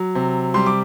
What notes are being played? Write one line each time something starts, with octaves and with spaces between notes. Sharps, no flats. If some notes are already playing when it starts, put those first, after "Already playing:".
Already playing: F#3
C3
G3 C6
D6